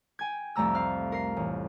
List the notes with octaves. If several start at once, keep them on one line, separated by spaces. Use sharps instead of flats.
G5 G#5 G#6
C2 F2 G3 A3 A#5 E6
C4 F5
A#4 C7
A1